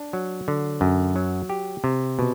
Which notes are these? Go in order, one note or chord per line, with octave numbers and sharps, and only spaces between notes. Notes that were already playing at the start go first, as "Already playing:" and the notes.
Already playing: D4
F#3
D3
F#2
F#3
G4
C3
B2